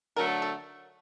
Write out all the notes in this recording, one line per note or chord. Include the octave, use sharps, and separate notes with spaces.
D3 F#3 A3 A#4
A4